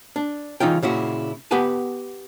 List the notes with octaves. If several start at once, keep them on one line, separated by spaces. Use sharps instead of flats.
D4
C#3 E3 D#4 F4 G5
A#2 C#3 E4 F#4
B3 G4 B4 F#5 G#5 A5